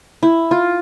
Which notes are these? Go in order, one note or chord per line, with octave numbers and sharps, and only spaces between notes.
E4
F4